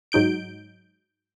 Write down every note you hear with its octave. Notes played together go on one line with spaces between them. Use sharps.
G#2 F#3 D#4 G6 D7